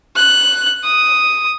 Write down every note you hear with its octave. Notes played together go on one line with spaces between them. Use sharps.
F#6
D#6